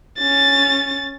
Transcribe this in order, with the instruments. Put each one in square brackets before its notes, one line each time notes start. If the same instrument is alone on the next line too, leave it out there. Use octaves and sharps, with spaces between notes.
[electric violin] C#4 A6